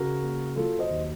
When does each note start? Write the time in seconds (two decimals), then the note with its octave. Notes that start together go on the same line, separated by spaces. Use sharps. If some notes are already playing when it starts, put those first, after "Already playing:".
Already playing: C#3 F#4 A#4
0.22 A#3
0.56 F#3 F4 A4
0.79 C5 D#5
0.91 D#2